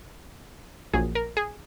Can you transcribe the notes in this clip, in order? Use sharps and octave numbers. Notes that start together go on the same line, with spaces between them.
A#1 A#2 F#3 G#4
A#4
G#4